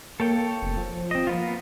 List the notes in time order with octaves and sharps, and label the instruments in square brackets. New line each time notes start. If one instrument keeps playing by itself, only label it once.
[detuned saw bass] A#3 [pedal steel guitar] A4 C#5 G5
[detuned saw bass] F1
F3
[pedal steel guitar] C4 D#5
A#3 B3 F4